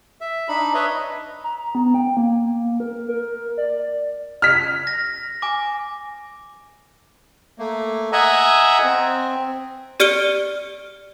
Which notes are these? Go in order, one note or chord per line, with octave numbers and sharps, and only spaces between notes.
E5
D4 D#4 B5
B4 C#5 D#5 E5
A#5
B3
G5
A#3
A#4
A#4
D5
F6 B6
A#6
G#5 D6
A3 A#3
D#5 E5 F#5 G#5 A#5 E6
C4
G4 D5 F6 C#7 D7 G7